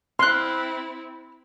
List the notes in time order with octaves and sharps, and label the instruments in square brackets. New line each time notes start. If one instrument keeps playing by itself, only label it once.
[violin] C4 E4 [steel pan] C6 [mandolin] F6 F#6